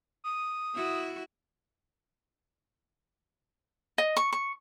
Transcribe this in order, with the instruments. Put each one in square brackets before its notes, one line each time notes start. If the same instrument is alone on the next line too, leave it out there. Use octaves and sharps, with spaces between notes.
[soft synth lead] D#6
[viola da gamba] E4 F#4
[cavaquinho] D#5
C#6
C#6